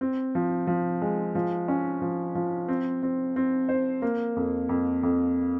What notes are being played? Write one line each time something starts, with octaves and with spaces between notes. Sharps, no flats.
C4
F3
F3
G#3
F3
C#4
F3
F3
C4
C4
C4
C5
A#3
F2
F2
F2